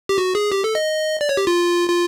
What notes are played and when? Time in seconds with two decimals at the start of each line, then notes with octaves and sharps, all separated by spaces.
0.09 G4
0.18 F#4
0.35 G#4
0.52 G4
0.64 A4
0.75 D#5
1.21 D5
1.29 C#5
1.37 G4
1.47 F4
1.89 F4